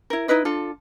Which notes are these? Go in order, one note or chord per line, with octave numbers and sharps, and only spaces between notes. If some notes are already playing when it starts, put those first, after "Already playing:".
E4 A#4
D#4 E4 B4 D#5
D4 F4 A4